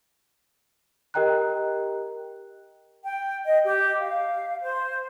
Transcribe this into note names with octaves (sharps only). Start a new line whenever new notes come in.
G4 A#4 D#5 G5 A#5 F#6
G5
D#5
G4
F5
C5